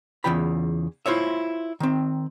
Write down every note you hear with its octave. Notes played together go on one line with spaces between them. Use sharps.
E2 C#3 E3 F4 G5 B5
E4 F4 C5 C#5 E5
D#3 C4